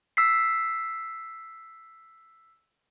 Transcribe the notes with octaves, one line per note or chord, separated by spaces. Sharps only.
E6 B6 C7